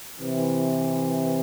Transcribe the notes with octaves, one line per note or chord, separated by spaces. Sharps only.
C3 E3